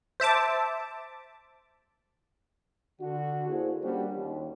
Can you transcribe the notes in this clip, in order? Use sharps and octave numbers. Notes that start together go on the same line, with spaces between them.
C5 E5 A5 D6
D3 F#4
A#3 E4 G#4 A4 C5
G3 A#3 C#4 D4 F4 F#4
D#2